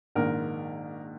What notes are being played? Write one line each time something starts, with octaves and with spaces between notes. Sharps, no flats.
A#1 G#2 D#3 A#3 A#4